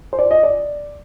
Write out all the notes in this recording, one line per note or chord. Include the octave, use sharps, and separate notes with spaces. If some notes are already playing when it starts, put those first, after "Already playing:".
C5
D5
D#5
D5